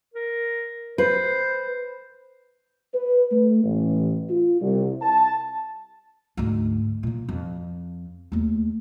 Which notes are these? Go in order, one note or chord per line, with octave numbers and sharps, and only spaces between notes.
A#4
B4 C5
B4
A3
A1
F4
C2
A5
D2 G#2
A#2 A#3
F2
D#2 A3